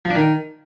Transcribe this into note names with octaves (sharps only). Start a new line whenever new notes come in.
F3
D4
D#3